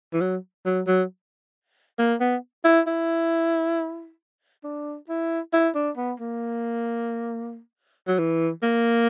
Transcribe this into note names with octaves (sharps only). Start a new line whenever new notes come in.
E3
F#3
F#3
F#3
A#3
B3
E4
E4
D4
E4
E4
D4
B3
A#3
F#3
E3
A#3